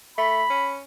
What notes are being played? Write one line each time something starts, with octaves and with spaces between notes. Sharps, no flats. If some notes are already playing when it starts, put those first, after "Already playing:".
A3 B5
C#4